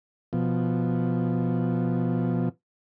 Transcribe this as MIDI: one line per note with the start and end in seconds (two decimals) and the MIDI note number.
0.33 2.49 47
0.33 2.49 53